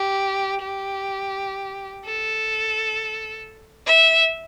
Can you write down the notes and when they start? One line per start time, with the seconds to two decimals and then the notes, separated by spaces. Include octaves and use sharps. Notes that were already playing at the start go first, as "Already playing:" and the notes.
Already playing: G4
0.61 G4
2.05 A4
3.86 E5